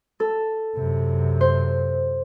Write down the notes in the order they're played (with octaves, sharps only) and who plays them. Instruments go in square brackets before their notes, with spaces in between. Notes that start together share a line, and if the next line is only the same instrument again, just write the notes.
[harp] A4
[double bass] F#2 C3
[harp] C5